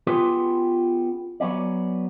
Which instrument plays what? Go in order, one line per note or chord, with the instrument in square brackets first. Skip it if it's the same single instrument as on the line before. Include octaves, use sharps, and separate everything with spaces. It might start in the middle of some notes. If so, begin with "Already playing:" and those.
[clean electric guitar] B3 C#4 F4 G4 G#4 B4
F#3 B3 C#4 D5